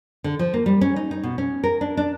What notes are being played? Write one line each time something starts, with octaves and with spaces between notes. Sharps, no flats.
D3
F3
A#3
G3
C#4
D#4
D#4
B2
C#4
A#4
D4
D4